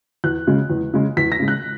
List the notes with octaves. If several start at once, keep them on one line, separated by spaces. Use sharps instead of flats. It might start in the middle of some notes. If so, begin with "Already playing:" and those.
E2 F#6
C#3 G#3
E2
C#3 G#3
E2 B6
A#6
C#3 G#3
F#6